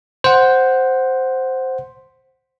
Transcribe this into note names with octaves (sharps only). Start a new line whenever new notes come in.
C5 F#5